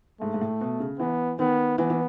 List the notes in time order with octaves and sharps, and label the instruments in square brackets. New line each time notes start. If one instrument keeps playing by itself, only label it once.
[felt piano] G#2 [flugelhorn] A3
[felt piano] G#2
A2
B2
C#3
[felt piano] E3 [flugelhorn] B3
[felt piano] D#3 [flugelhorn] B3
[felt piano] E3 [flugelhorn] B3
[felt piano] E3